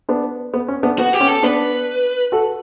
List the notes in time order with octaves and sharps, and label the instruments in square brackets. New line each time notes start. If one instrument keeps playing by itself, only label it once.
[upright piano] B3 D4
B3
C#4
B3 D4
[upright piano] B3 [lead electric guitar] F#4
[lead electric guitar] G4
[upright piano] C#4
[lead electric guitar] A4
[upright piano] B3 D4 [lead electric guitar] B4
[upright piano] F#4 A4